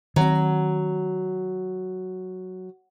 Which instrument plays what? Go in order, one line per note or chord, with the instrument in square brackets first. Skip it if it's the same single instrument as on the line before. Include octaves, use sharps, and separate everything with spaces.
[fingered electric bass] D#3 C4 [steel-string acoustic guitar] F#3